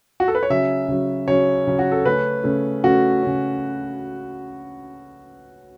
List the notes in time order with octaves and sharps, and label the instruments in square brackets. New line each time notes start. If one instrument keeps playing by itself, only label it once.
[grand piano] F#4
A4
B4
C#5
C#3 F#3 C#4 E5
C#3 F#3 C#4
C#3 F#3 C#4 C#5
C#3 F#3 C#4
F#4
A4
C#3 A3 C#4 B4
C#3 A3 C#4
C#3 A3 C#4 F#4
C#3 A3 C#4